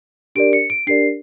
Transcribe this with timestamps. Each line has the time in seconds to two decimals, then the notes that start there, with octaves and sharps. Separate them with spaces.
0.35 D4 G4 A#4 D5 D7
0.53 C#7
0.70 D7
0.87 D4 G4 A#4 D5 C7